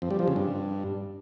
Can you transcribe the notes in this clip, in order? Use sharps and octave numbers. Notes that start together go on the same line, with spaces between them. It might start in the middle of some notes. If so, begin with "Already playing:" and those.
F2
G3
F3
C#3
G2